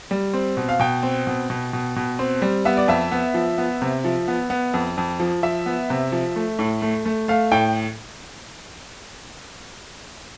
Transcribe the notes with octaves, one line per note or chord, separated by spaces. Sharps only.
G3
C4
B2
F5
B2 G5
C4
B2
B2
B2
B2
C4
G3
B3 E5
D5
F2 E5
B3
F3
B3
C3
F3
B3
B3
F2
F2
F3
F3 E5
B3
C3
F3
A3
A2
A3
A3
A3 F5
A2 G5